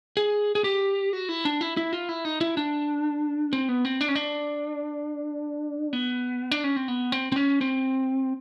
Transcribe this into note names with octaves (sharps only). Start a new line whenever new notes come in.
G#4
G#4
G4
F#4
E4
D4
E4
E4
F4
E4
D#4
E4
D4
C4
B3
C4
D4
C#4
D4
B3
D4
C#4
C4
B3
C4
C4
C#4
C4